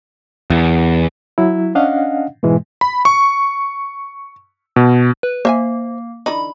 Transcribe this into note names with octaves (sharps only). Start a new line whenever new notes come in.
E2
F#3 E4
C#4 D4 D#5 F5 F#5
G#2 B2 E3 G#3
B5
C#6
B2
B4
A#3 C5 E5 G#5
D3 E3 D#4 B5